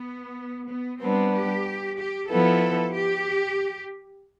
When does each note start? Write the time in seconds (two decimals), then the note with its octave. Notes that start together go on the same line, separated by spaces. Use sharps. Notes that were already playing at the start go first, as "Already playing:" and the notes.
Already playing: B3
0.69 B3
1.01 G3 B3 C4 D4
1.34 G4
1.98 G4
2.30 F3 B3 E4 A4
2.94 G4